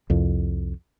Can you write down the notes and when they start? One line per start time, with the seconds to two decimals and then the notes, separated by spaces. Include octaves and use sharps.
0.10 C2 F2